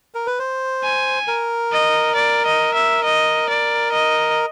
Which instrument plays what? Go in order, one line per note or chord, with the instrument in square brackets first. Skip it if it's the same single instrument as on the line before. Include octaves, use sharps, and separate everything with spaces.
[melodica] A#4
B4
C5
[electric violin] G#5
[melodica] A#4
[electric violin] D#5
D5
D#5
E5
D#5
D5
D#5